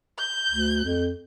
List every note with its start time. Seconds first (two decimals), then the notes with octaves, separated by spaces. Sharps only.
0.18 G6
0.52 D2
0.85 F2